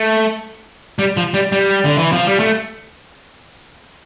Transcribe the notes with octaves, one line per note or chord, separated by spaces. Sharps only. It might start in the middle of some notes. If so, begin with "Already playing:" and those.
Already playing: A3
G3
F3
G3
G3
D3
E3
F3
G3
A3